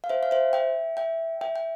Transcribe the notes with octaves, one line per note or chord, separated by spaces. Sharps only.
F5
C5 E5
F5
C5 E5
E5 G5
E5 G5
E5 G5
G5